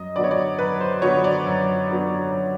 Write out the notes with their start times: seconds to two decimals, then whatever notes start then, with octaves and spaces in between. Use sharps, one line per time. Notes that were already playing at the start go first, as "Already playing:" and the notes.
Already playing: F#2 D#5
0.16 D3 F#3 B3 D5
0.24 C#5
0.31 D5
0.59 F#2 B4
0.81 C5
1.02 D3 F#3 B3 C#5
1.24 D5
1.46 F#2
1.89 D3 F#3 B3
2.32 F#2